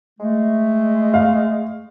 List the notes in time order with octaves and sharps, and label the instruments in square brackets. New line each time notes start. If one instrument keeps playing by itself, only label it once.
[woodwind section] G#3 A3
[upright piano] F5